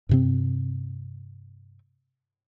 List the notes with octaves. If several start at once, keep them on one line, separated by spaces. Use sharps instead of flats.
G2 C3 C4